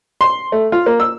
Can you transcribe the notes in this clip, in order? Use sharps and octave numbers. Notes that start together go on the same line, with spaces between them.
C6
A3
F4
A#3
E6